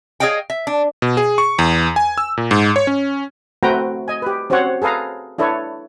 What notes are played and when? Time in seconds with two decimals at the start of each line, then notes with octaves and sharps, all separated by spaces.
0.20 G#4 C#5 D#5 F5 G5
0.50 E5
0.67 D4
1.02 B2
1.17 G#4
1.38 C#6
1.59 E2
1.96 G#5
2.18 E6
2.37 A#2
2.51 G#2
2.76 C#5
2.87 C#4
3.63 A3 C4 F#4 B4 G5 A#5
4.08 D#5 G#5
4.22 G4 B4
4.50 C4 C#4 F#4 C5 C#5 F#5
4.82 G#4 A4 B4 F5 A#5
5.38 D4 E4 A4 B4 C#5